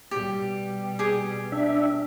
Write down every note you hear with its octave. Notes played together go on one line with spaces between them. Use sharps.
B2 G3 G4
G4 G#4
D4 E5